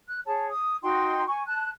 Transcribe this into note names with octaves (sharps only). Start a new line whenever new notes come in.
F#6
G#4 C#5 A5
D#6
D#4 F#4 G5 C6
G#5 C#6
A5 F#6